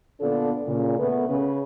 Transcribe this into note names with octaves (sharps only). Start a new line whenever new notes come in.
A#2 D3 B3 D4 F4 A4
A#2 C#3
A3 B3
C#3 C#4 B4